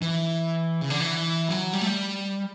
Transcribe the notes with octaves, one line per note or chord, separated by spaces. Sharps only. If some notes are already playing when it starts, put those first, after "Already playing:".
E3
C#3
D3
E3
F#3
G3
A3
G3